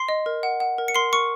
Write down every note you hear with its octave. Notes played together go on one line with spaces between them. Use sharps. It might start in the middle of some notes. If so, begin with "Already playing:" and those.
Already playing: C6 C7
D#5
A#4
F#5
F#5
A#4
C#7
A#4 C6 C7
A#4 C#6 C#7